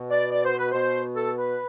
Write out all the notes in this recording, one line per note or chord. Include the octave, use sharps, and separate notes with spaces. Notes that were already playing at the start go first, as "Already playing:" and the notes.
Already playing: B2
D5
D5
C5
B4
B2 C5
A4
B4